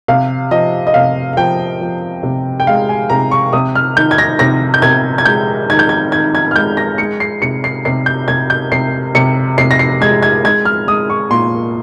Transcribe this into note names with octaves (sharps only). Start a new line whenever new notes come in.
C3 F5
F3 D#5
D#5
C3 F5
F5
F3 G5
F3
C3
G5
G#3 F5
G#5
C3 A#5
C#6
C3 D#6
F6
D#3 G6
G#6
A#6
C3 A#6
G6
C3 G#6
G#6
G#3 G6
D#3 G#6
G6
G#6
D#3 G#6
G#6
F6
G#3 G6
A#6
G#3 C#7
C7
C3 C#7
C7
C3 C7
G6
C3 G#6
G6
C3 C7
C3 C#7
C3 C7
A#6
C7
G#3 G#6
G#6
G#3 G#6
F6
G#3 D#6
C#6
A#2 C6